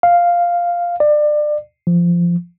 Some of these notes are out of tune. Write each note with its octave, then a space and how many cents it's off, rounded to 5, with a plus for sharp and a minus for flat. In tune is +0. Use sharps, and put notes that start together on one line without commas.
F5 +0
D5 +25
F3 -15